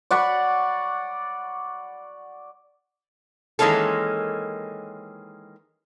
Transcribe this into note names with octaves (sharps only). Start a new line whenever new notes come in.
D5 F#5 B5 C#6
D#3 E3 G#3 A#3 C#4 A4